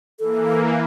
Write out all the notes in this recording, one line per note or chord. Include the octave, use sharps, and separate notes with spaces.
E3 A#3 A4